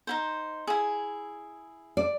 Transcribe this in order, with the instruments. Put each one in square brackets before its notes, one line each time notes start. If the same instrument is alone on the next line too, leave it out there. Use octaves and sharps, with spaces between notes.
[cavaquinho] D#4 E4 C5
E4 G#4
[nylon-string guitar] D5